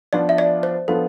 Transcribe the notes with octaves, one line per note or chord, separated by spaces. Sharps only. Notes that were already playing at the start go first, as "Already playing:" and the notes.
F3 B3 D4 F4 B4 D5
E5
D5
C5
F3 B3 D4 F4 A4 B4